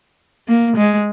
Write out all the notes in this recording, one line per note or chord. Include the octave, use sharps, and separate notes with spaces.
A#3
G#3